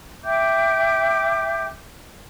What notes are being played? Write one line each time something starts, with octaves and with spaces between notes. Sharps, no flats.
E5 G5 D6 G6